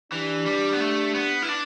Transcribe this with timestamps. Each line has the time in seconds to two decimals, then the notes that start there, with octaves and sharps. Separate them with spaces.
0.13 E3 D4 G4
0.46 G3
0.73 B3
0.80 A3
1.14 B3
1.43 E4
1.49 D4